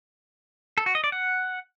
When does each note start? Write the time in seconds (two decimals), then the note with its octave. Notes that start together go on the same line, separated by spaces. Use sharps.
0.78 A4
0.86 F#4
0.95 D#5
1.04 D5
1.12 F#5